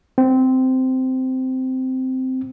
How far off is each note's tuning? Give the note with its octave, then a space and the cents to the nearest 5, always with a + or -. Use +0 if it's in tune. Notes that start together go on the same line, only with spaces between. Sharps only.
C4 -10